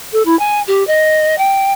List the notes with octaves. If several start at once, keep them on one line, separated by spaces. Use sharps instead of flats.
A4
E4
G#5
G4
D#5
G5